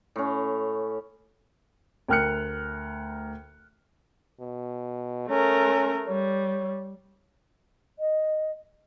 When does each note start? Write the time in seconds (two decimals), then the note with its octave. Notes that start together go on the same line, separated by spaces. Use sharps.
0.16 A2 C#4
2.08 D2 A#4 G5 F6 F#6 C#7
4.40 B2
5.30 A3 C#4 A#4
6.08 G3 C#5
7.99 D#5